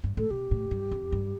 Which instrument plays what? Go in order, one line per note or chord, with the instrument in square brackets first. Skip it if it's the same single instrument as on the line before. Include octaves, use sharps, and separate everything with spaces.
[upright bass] G2
[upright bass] A2 [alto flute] A4
[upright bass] B2 [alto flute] G4
[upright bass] A2
G2
F2
G2